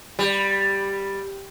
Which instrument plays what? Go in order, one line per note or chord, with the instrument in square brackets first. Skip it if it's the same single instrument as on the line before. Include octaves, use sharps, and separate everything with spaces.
[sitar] G3